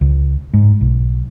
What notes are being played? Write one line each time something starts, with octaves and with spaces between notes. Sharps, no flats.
C#2
G#2
B1